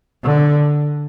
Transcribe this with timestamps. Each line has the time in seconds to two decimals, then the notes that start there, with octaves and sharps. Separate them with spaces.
0.24 D3